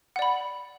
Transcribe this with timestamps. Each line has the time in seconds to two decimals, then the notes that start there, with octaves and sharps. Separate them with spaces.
0.16 F#5
0.19 D5
0.22 B5